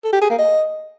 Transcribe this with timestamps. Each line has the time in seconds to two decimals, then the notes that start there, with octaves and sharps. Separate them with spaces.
0.04 A4
0.13 G4
0.21 G#4
0.30 A#3
0.39 D#5